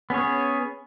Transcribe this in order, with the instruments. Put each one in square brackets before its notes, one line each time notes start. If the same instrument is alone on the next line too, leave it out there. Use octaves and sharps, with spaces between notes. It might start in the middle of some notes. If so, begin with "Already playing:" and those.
[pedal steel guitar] B3 C#4 G#4 C#5